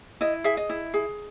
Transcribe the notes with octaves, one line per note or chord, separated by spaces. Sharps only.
E4 D#5
G#4 E5
D#5
E4
G#4